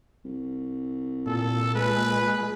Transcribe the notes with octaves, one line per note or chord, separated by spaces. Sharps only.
C2
A#2 A4
G#3 B4